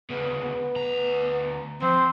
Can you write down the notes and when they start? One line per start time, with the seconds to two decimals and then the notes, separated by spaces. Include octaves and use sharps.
0.10 D2 C#3 B3
0.43 B3
0.76 D2 A#5
1.82 F3 C4 C5